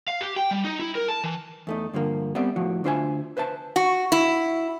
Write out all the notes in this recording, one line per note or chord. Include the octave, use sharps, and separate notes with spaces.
F5
G4
G5
G3
D#4
E4
A#4
A5
E3
E2 A3 D#4
G2 D3 F3 A#3
G3 B3 C4 D5 E5
A2 F3 F#4
D2 D4 F4 C5 E5 G#5
B4 C5 E5 A5
F#4
E4